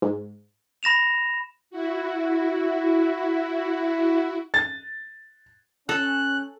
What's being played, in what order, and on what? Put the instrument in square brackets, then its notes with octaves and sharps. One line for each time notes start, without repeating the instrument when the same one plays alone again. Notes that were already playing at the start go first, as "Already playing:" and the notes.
[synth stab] G#2
[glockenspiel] B5 A#6 E7 F7
[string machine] E4 F#4
[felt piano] A6
[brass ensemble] C#4 [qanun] A4 [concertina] F#6